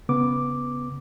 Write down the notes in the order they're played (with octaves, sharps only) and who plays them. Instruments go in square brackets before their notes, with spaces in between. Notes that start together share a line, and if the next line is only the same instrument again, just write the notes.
[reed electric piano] C#3 B3 D6